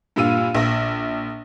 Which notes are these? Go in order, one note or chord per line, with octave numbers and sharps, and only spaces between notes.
G2 A#2 F4 E6 D#7
A#1 A#6